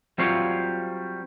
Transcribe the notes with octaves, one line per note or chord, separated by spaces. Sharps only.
F#3 G3 C4 F4 C#5 F5